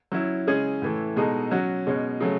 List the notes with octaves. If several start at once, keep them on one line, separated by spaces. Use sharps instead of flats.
F#3 C#4 E4
C#3 G#3 C#4 G#4
A2 E3 A3
B2 G#3 D#4 A4
F#3 C#4 F#4
B2 G#3 C#4
C#3 F#3 A3